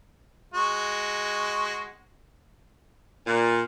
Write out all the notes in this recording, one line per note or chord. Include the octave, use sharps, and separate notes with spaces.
G#3 F#4
A#2